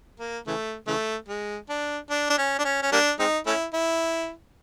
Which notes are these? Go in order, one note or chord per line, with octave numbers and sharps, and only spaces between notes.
A#3
C#3 E3 A3
C#3 E3 A3
G#3
D4
D4
D4
C#4
D4
C#4
C#4
G3 A#3 D4
G#3 C4 D#4
A3 C#4 E4
E4